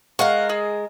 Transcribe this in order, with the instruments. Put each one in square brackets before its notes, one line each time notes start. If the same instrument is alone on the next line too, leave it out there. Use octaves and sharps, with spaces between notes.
[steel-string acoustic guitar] G#3 A#4 [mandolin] F5 F#5 C#6
[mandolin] G#4